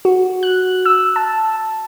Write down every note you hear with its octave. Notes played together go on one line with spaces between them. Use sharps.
F#4
F#6
E6
A5